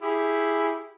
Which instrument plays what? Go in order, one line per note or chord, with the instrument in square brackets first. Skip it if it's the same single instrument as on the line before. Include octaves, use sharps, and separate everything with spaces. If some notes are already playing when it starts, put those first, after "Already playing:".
[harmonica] E4 G4 G#4